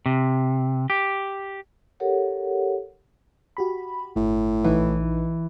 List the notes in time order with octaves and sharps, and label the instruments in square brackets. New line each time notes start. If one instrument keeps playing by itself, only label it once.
[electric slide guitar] C3
G4
[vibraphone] G4 A4 A#4 C#5 F#5
[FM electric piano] F#4 G4 B5
[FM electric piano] G1 [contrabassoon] A2
[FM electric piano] A#1 D#4 B4 [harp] E3